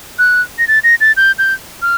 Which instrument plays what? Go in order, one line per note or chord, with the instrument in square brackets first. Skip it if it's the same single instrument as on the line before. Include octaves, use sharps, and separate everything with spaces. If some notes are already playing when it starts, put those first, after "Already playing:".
[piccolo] F#6
A#6
A6
A#6
A6
G6
G6
F6